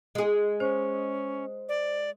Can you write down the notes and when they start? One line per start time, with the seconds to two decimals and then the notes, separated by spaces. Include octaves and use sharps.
0.15 G#3 G#4
0.60 C#4 C5
1.69 D5